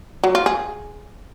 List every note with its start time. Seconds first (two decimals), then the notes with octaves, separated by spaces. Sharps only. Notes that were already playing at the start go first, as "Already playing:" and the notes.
0.24 F#3
0.35 F4
0.46 G#4